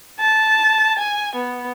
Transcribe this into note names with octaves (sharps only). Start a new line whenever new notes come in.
A5
G#5
B3